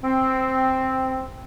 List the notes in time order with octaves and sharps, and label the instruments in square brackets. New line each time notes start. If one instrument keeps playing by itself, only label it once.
[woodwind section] C4